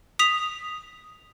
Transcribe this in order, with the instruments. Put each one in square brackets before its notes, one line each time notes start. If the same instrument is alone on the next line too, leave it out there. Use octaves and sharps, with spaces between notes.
[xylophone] D#6 B6 F7